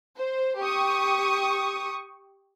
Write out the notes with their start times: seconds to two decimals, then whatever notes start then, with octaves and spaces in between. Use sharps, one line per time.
0.19 C5
0.62 G4 C#6 D#6